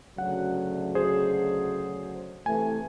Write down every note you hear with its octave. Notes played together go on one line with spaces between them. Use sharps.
D2 C#3 F#3 F#5
G#4 C5
C3 E3 A3 G#5